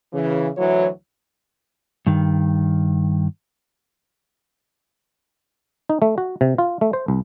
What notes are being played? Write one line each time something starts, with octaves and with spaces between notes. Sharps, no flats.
C#3 E3
D2 E3 F#3 E4 F#4 C#5
G2 D#3
D#4
A3
F#4
C3
F4
A3
C5
C2